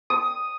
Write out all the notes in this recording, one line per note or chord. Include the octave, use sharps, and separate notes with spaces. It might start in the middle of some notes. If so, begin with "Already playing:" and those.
D#6